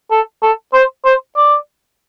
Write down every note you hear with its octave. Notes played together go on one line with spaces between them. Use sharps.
A4
A4
C5
C5
D5